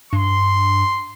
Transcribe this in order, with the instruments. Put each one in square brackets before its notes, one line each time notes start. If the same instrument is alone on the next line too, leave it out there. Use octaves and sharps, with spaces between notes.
[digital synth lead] G2 [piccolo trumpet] C6